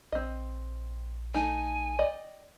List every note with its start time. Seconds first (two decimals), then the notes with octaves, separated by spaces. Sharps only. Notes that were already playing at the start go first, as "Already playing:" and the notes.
0.12 A#1 C4 D#5
1.34 A3 D#4 G#5
1.99 D5 D#5 G5